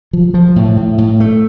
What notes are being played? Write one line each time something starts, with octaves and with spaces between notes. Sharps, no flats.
F3
F3
A2
A2
A2
A3